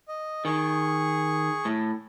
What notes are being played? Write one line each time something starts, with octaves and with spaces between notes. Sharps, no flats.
D#5
D#3 G#4 C#6
A2